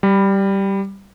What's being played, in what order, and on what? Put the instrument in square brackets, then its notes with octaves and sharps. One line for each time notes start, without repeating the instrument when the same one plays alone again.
[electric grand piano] G3 B5